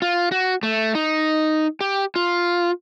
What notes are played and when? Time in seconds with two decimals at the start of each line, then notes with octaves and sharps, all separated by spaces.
0.02 F4
0.32 F#4
0.63 A3
0.95 D#4
1.81 G4
2.16 F4